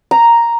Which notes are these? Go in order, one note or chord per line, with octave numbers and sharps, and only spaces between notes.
A#5